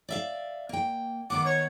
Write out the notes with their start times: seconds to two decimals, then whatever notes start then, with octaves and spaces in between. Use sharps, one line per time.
0.09 D5 E5 F5
0.69 A#3 G5
1.30 D#3 B3 F#5 D6
1.45 C#5